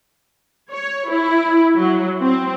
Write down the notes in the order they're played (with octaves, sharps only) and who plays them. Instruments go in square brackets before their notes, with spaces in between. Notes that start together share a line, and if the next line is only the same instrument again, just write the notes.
[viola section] C#5
E4
F#3
C4